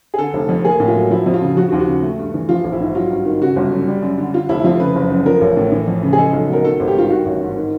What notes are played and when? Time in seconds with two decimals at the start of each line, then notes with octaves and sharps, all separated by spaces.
0.14 G#4
0.18 D3 A4
0.34 F1
0.49 F2
0.65 A#3 G#4
0.80 A2
0.88 F4
0.96 F#3
1.11 F3 E4
1.26 F2
1.34 F4
1.42 C#3
1.57 F3 F#4
1.69 F#4
1.72 D#2
1.80 F#4
1.88 C#3
2.03 A3
2.18 G2
2.34 E3
2.49 F3 F4
2.64 A#1
2.72 E4
2.80 G#2
2.95 F#3 F4
3.10 G2
3.26 D#3
3.41 C#3 F#4
3.56 G1
3.72 F#2
3.88 G3
4.03 F#2
4.18 D3
4.34 D3 F4
4.49 F1 E4
4.60 E4
4.64 F2 F4
4.80 C#3 B4
4.95 F#1
5.10 F#2
5.26 F3 A#4
5.41 A1
5.57 A2
5.72 E3
5.87 F2
6.03 C#3
6.13 G#4
6.18 G#3 A4
6.33 B1
6.49 B2 A#4
6.64 D#3 A4
6.80 G#1
6.87 G4
6.95 G2 F4
7.10 D#3 F#4
7.26 A1
7.41 G#2
7.57 D#3